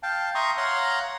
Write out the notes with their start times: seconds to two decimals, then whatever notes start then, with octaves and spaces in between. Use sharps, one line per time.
0.03 F5 G5 A5
0.35 E5 A#5 C6 C#6 D#6
0.57 C#5 F5 F#5 A#5 C6